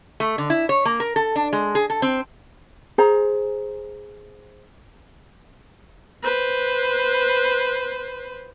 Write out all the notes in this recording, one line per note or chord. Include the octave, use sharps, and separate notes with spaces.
A3
D3
E4
C#5
A#3
A#4
A4
D4
G#3
G#4
A4
C4
G#4 C5 A#5
B4 C5